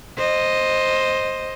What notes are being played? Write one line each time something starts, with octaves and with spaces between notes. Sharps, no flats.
C5 D#5